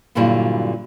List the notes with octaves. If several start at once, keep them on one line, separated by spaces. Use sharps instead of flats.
G2 A#2 D3 F#3 G3 E4